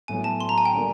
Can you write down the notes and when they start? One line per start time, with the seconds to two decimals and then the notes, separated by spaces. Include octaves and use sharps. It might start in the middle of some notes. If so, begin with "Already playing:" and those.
0.08 A2 F#3 B3 G#5
0.24 A5
0.40 C6
0.49 A#5
0.58 G#5
0.66 G5
0.73 D3 G3 A#3